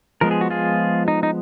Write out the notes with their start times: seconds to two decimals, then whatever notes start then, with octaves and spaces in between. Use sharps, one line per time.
0.21 F3 G#3 B3 A#4
0.31 G#4
0.41 F#4
0.50 F4 G#4
1.08 D#4
1.23 D#4